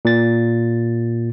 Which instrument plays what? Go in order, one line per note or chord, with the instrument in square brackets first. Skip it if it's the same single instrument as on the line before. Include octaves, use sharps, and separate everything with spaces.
[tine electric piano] A#2 A6